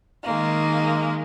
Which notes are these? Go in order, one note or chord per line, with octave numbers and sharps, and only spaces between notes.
D#3 G#3 A#3